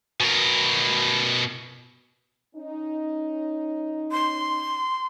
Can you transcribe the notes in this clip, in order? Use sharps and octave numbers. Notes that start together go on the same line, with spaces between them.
B2 A#4
C#4 D#4
C6